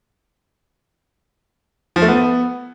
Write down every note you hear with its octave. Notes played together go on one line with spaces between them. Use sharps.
F3
A3
B3